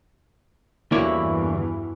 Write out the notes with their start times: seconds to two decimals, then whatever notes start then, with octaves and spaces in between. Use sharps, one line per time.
0.92 E2 G2 D3 E3 A#3 E4 F#4 C#5